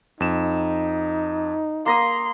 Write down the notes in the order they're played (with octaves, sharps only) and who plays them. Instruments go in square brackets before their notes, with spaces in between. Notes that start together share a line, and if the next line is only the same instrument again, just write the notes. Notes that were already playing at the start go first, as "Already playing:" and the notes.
[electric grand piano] F2 E7 [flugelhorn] D#4
[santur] A#3 A#5 D#6 [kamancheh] C6